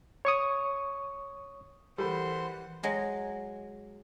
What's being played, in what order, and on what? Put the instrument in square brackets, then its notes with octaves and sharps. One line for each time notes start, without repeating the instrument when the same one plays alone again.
[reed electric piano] C#5 C#6 D#6
[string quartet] E3 F#5 [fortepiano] G3 [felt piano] A4 A#4 B5 [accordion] C5 C6
[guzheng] F#3 G#3 F5